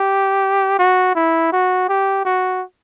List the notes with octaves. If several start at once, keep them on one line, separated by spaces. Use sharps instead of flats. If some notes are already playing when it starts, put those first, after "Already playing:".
Already playing: G4
F#4
E4
F#4
G4
F#4